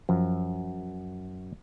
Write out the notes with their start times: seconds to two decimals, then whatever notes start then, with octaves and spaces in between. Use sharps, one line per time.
0.09 F#2 F3